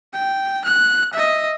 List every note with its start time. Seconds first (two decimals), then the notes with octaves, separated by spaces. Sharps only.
0.14 G5
0.65 F#6
1.13 D#5 E5